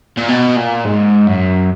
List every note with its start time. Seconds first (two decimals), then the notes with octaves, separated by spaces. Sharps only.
0.18 A#2
0.28 B2
0.57 A#2
0.85 G#2
1.27 F#2